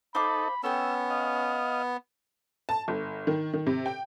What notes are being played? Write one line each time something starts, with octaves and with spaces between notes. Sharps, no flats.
D#4 A4 C5 F5 B5 D6
B3 C#4 A4 C#5 G5 E6
D#5 F5
A5
G1
D#3
D#3
C3
G5